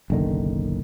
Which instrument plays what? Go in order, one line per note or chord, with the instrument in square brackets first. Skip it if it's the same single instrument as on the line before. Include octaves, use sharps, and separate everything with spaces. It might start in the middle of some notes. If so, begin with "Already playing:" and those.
[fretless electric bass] F#1 B1 D3 D#3